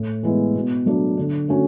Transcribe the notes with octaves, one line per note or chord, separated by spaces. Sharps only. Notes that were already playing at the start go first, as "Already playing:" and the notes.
Already playing: A2
E3 G#3 B3 E4
B2
F#3 A3 D4
D3
A3 C#4 F#4